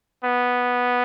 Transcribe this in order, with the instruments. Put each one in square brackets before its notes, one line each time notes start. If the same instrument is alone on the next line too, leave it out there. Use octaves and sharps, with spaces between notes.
[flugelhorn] B3